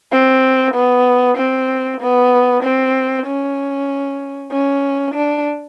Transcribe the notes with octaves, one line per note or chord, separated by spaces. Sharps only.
C4
B3
C4
B3
C4
C#4
C#4
D4